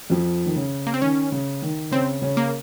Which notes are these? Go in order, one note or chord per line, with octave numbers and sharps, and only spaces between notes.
F2 F3
D#3
C#3
A#3
C4
D#3 C#4
C#3
D#3
C#3 C4 C#4
C#3 C#4
A#3